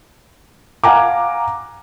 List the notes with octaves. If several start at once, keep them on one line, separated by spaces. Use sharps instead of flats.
F5 F#5 G#5 A#5 D6